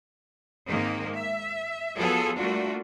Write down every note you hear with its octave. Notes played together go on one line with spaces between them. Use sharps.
G#2 D#3 G#3 A#3 C4
E5
F3 F#3 B3 F4 G#4 A4
G3 A3 A#3 D4 F4 F#4